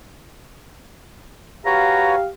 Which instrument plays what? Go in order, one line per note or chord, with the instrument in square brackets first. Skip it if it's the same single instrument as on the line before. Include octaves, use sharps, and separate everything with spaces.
[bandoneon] F#4 B4 C#5 [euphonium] G4 [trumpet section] F5 [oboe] A#5